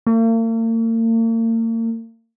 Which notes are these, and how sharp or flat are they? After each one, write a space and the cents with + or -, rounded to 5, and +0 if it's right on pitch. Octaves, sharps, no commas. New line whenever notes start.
A#3 -45